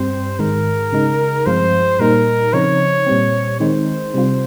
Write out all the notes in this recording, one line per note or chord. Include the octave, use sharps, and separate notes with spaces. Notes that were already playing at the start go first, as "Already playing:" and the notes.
Already playing: G2 G3 C4 C5
G#2 D#3 G#3 A#4
C#3 G#3 D#4
G2 F3 G#3 C4 F4 C5
A#2 G3 A#3 D#4 A#4
C#3 F3 C4 D#4 C#5
A#2 G3 C4
D#3 G#3 C4 D#4 C5
C3 G3 C4 F4